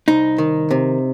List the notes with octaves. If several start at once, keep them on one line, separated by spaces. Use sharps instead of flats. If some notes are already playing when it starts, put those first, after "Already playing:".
C2 D#4
D#3
C3